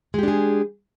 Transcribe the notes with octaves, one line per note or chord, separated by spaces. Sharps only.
G#3 D4 G4 G#4